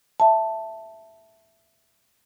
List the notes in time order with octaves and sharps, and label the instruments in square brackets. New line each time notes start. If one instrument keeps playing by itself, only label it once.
[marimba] E5 A5